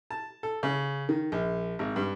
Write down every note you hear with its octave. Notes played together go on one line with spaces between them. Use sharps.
A5
A4
C#3
D#3
A#1
G#1
G2